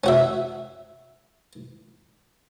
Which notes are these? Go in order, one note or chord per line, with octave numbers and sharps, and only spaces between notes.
C#4 F#4 E5